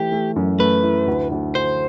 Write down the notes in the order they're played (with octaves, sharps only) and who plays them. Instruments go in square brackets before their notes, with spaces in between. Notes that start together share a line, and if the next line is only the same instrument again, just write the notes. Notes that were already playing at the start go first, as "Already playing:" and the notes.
Already playing: [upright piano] E3 A3 E4 [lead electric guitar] G4
[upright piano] A3
F#2
[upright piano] A3 [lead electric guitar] B4
[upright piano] E4
D2
D2
[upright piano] D2 [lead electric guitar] C5